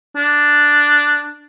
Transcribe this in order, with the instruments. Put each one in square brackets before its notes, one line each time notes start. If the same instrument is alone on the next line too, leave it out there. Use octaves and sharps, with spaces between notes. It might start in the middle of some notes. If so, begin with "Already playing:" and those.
[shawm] D4